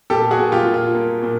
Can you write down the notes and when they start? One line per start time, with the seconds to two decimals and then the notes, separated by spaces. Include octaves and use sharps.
0.10 A#2 G4 A4
0.31 F#4 G#4
0.39 A#2
0.52 F4 G4
0.66 A#2
0.74 F4
0.94 A#3
1.22 A#2